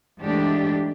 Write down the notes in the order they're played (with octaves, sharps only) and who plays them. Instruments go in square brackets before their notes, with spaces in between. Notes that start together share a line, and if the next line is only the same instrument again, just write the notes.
[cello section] G#2 E3 A3 D4 G4